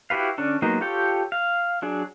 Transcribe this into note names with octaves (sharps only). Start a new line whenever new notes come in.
E4 F#4 G4 B4 F5
D3 C#4 D4
F#3 G#3 A#3 B3 D#4
F4 G4 A4 C#5 G5
F5
F#3 D4 G#4